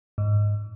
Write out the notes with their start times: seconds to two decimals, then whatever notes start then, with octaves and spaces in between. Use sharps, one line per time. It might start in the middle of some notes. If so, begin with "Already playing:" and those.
0.18 G#2